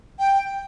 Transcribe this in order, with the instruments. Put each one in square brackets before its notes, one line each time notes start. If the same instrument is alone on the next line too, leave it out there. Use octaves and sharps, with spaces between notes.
[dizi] G5